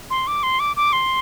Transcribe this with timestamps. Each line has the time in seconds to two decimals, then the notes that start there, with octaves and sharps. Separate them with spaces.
0.10 C6
0.27 D6
0.43 C6
0.59 D6
0.76 D6
0.93 C6